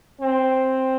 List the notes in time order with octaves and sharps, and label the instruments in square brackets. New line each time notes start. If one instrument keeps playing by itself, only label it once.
[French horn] C4